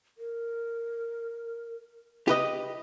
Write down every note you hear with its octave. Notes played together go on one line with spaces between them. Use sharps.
A#4
G4 B4 D#5